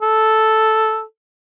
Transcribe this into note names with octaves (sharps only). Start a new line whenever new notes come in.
A4